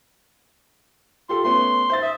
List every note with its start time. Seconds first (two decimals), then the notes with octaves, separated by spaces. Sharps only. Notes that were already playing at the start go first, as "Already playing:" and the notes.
1.29 F4 G4 A4 C6
1.44 A3 B3 C#4 C6
1.90 C5 E5 A6
2.02 E5 D#6